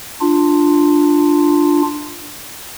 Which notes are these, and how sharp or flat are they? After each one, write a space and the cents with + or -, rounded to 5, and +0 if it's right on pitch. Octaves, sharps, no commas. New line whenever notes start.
D4 +10 F4 +0